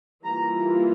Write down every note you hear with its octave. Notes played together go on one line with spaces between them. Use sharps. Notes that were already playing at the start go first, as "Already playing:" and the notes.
E3 G3 A#3 F4 A#5